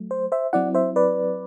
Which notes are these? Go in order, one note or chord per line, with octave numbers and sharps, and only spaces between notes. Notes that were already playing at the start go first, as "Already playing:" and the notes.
Already playing: F#3 A3
C5
C5 E5
F#3 C4 E4 D5 F#5
C5 E5
B4 D5